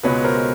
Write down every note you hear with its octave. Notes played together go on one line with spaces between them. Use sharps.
C#2 B2 G#3 B4 C#5
A#4 C5